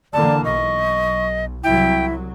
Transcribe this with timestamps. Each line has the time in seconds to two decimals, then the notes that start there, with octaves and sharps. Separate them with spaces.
0.13 D3 E3 A#3 D5 A5
0.45 B1 D#5 C#6
1.64 C2 F#3 E4 G5